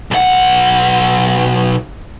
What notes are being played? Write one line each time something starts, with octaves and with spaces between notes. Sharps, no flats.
B1 F#5